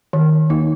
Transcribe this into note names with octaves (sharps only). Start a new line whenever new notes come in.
D#3
A#3 D#4